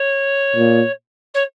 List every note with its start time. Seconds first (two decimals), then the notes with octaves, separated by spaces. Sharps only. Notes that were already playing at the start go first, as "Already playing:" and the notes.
Already playing: C#5
0.56 A#2
1.34 C#5